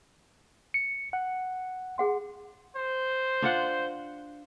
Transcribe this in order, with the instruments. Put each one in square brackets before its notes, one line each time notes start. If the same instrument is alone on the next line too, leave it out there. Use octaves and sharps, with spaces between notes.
[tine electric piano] C#7
F#5
[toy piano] G#4 F#5 C6
[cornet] C5
[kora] D4 F4 F#5